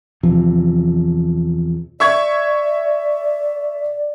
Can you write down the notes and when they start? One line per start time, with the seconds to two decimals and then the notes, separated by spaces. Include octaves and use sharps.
0.23 E2 C3 F3
2.00 D5 E5 C#6 G#6